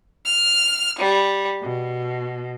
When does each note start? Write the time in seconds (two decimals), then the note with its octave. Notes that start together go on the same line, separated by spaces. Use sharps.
0.25 F6
0.99 G3
1.63 B2